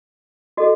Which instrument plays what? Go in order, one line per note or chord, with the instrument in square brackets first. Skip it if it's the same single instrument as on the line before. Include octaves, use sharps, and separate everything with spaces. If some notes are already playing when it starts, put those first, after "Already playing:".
[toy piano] F#4 A4 D#5